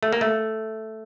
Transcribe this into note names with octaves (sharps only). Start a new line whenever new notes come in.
A3
A#3
A3